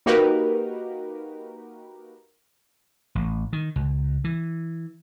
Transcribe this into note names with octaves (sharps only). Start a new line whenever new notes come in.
A#3 D#4 F#4 G4 A#4 B4
A1
D#3
C#2
E3